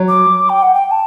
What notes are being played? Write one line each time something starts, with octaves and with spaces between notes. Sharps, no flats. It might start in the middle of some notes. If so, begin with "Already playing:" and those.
Already playing: F#3
D6
G5
F#5
G5
A5